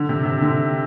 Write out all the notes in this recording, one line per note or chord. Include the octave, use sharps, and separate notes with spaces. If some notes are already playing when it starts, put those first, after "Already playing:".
Already playing: D3
C3
C3
D3